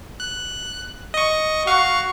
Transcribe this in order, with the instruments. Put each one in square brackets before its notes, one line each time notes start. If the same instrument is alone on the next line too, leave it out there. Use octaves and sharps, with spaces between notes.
[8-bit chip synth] F#6
D#5 C#6
[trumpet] F#4 [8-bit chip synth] F5 C#6